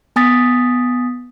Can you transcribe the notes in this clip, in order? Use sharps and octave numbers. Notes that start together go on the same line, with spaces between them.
B3 G#5 D#6 A6 B6